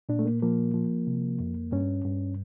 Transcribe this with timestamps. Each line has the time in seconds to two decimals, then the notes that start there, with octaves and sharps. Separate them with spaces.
0.09 A#2 D4
0.19 A3
0.25 A#3
0.42 F3 A#3
0.74 F3
1.07 C3
1.40 F2
1.72 G2 C#4
2.05 G2